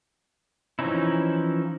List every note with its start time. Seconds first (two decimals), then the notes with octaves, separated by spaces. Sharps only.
0.79 E3 F3 C#4 D#4 E4